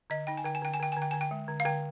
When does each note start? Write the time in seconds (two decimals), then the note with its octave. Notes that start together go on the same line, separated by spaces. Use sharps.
0.10 D3 D#5
0.27 D#4 G5
0.37 G#5
0.44 D3 G5
0.55 G#5
0.62 D3 G5
0.74 G#5
0.79 D3 G5
0.92 G#5
0.97 D3
1.02 G5
1.11 D3 G#5
1.21 G5
1.31 G#3
1.48 D3
1.60 F5
1.65 D3 G5